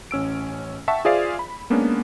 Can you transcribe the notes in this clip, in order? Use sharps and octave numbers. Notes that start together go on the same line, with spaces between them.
A1 C#4 E6 D7
E5 F#5 G5 A5 C#6
F4 G#4 C5 D5 E5 F5
B5
G#3 A#3 B3 C#4 D4